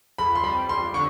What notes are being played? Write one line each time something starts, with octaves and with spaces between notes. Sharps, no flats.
F2 B5
C6
G3 B5
F2 C6
D3 C#6